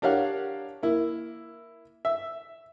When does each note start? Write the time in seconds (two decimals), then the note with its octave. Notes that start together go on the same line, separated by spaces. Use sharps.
0.02 D4 G4 A#4 C#5 F5 F#5
0.83 A#3 E4
2.05 E5